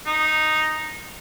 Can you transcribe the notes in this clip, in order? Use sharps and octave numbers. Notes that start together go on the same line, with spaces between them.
D#4